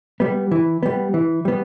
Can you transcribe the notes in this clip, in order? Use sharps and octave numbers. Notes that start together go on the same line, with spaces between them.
G3 B3
E3
G3 B3
E3
G3 B3